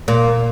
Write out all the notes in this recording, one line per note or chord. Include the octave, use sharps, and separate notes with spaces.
A#2